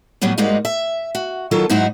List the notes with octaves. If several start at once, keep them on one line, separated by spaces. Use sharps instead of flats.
A2 F#3 G3 B3 C#4
G#2 G3 G#3 A#3 D#4 F#4
E5
F#4
D#3 F#3 A#3 F4 A4
G#2 F#3 D#4 E4 F#4 C5